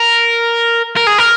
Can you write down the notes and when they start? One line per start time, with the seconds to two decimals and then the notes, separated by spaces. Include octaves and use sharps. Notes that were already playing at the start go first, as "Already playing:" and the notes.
Already playing: A#4
0.96 A#4
1.07 G#4
1.18 A#4